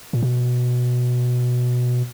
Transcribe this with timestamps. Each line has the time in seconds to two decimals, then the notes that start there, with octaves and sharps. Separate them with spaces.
0.13 A#2
0.23 B2